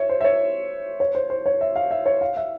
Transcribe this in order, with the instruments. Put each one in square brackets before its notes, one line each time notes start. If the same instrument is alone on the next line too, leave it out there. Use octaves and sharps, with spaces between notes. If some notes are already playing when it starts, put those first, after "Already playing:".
Already playing: [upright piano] C#5 E5
C5
E5
C#5
C#5
C5
C5
C#5
E5
F5
E5
C#5
F5
E5